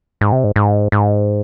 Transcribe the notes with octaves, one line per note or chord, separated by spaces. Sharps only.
G#2
C3
G#2
G#2
G#2